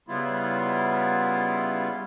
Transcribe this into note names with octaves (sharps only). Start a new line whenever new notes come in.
C#3 G3 B3 E4 F4